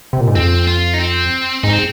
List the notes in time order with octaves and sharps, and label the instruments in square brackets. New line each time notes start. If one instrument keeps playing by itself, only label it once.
[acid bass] C3
A#2
G#2
[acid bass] F2 [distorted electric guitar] C4
[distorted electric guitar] F4
D#4
C4
[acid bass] G#2 [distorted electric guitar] D#4
[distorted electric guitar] C4